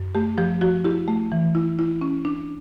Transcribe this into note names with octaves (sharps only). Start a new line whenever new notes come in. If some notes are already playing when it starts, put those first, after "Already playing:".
Already playing: F#2
A3 G4
F3 G4
F3 F#4
E4 G4
A3
E3
E4
E4
C#4
D4